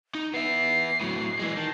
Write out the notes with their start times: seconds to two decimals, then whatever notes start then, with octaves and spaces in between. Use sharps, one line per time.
0.15 D#4
0.34 B3 E5 C7
1.01 A2 F#3
1.39 E3 G#3
1.57 D#3 A5